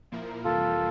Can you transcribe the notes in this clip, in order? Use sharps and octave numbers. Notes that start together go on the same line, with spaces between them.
A#2 F3 A#3 E4 A#4
F2 C3 E3 G3 A#3 F4 A4